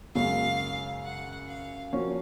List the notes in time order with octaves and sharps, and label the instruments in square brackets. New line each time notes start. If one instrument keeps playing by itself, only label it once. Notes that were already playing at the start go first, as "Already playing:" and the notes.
[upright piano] F#2 C#3 G#3 C#4 [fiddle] F5
[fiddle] F#5
F5
[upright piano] F3 A#3 C#4 F#4 C#5